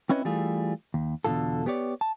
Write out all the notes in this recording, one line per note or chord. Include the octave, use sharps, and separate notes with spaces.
C4 C#4 E4 B4 C#5 D#5
E3 G3 A3 F4 G#4
D#2
E2 B2 D3 D#3 F4 A4
B3 G4 C#5 D5
A5